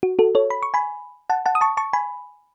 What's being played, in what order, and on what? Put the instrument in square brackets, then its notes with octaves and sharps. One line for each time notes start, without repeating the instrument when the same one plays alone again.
[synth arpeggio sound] F#4
F#4 A4
A4 C#5
B5
C#6
G#5 B5
F#5 A5
F#5 A5
D#6
A5 C#6
A5 C#6
G#5 B5